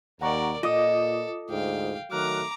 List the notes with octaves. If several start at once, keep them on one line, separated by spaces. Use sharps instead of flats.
D#2 A#4 D5 F#5 A#5 C#6
A#2 F4 A4 D#5 D6 D#6
D2 G#2 F5 G5
D#3 F#3 A3 A#5 D6 F6 F#6